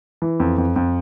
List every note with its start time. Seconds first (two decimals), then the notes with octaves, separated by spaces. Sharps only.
0.22 E3
0.40 F2
0.58 F2
0.76 F2